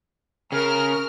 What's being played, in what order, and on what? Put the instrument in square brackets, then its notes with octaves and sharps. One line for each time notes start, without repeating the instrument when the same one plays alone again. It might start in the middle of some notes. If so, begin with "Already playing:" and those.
[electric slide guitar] C#3 [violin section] A#4 F6